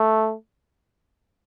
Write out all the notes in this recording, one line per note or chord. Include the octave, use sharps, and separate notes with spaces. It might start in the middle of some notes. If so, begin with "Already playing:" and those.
Already playing: A3